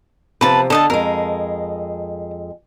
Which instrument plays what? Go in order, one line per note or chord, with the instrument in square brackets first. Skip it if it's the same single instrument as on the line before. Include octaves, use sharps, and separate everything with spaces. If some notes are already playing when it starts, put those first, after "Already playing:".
[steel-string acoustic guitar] C3 F3 [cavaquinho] B4 A5
[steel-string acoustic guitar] D3 [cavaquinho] A4 D#5 A5
[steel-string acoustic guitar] F2 G#3 [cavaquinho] A#4